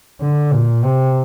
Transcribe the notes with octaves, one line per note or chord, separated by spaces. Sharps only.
D3
A#2
C3